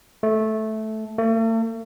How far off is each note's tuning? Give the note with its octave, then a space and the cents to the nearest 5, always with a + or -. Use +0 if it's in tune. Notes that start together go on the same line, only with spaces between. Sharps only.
A3 -10
A3 +45